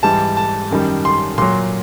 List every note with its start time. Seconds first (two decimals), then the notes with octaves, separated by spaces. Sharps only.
0.03 G#2 E3 G3 A5
0.37 A5
0.71 F#2 D#3 G3
1.05 C6
1.38 A#2 F#3 C6